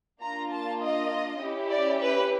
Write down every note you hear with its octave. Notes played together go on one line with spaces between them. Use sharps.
A#3 D4 F4 A#5
A5
D#5
C#4 E4 G4
D5
B4